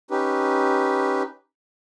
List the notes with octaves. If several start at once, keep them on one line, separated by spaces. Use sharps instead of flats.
C#4 D#4 G4 B4